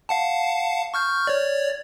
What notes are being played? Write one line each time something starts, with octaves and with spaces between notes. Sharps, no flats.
F5 F#5 A5
C#6 F6 G6
C#5 D5